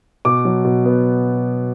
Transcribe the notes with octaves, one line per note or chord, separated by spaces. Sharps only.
B2 D6
F#3
B2
B3